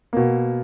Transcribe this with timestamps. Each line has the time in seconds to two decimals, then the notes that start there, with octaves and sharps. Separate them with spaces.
0.13 B2 A#3